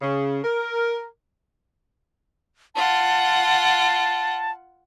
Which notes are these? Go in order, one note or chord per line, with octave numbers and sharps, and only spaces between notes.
C#3
A#4
F4 F#5 A5